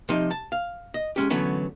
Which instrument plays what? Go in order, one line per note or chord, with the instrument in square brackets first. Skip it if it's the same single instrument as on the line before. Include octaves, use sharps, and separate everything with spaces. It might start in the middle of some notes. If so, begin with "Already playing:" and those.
[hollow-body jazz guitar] C3 F3 D#4 D#5
A5
F5
D#5
G#3 C#4 G4
D3 E3 F#3 A3 B3 C#4